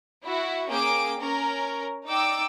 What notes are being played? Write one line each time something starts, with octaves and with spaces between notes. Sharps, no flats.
E4 F#4
A#3 C#4 G#4 G5 D6 D7
C#4 A#4
D#4 D5 G5 D6 E6 D7